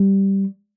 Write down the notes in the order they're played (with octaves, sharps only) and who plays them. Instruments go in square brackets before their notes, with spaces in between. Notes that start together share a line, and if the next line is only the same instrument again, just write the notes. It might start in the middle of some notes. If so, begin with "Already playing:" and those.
Already playing: [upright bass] G3